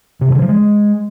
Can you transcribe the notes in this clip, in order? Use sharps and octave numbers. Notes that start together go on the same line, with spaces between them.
C3
G2
D3
F3
G#3